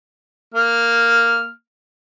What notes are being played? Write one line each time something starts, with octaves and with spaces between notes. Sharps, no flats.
A#3 F6